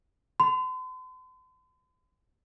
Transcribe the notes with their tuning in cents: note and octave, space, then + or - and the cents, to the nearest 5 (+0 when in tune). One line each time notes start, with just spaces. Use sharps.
C6 -45